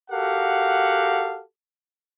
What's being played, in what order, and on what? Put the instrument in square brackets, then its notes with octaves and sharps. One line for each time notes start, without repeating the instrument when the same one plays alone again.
[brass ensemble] F#4 G4 A4 A#4 F5 F#5